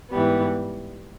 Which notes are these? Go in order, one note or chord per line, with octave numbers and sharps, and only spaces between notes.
G#2 E3 G3 B3